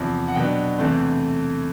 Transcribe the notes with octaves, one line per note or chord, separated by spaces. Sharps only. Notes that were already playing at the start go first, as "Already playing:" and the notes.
Already playing: E2 C3 F3
F#5
B2 F#3 B3 D4 G5
E2 C3 E3 A3 C4